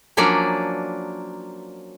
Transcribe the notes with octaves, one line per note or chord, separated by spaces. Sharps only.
F3 F#3 A#3 C#4 D4 D5